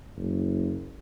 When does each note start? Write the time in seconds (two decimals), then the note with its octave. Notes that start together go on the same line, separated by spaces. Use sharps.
0.17 F#1